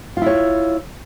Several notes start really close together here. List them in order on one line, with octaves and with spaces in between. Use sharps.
F4 E4 C#5